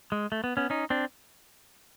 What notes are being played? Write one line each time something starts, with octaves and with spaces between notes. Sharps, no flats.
G#3
A3
B3
B3 C#4
C#4 D#4
C4 D4